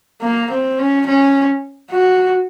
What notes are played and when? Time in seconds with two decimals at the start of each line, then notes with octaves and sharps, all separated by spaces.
0.21 A#3
0.50 C4
0.79 C#4
1.06 C#4
1.91 F#4